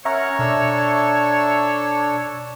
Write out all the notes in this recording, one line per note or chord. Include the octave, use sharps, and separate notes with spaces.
C#4 A#4 C#5 E5 F#5 A#5 C#6
B2 D4 A4 E6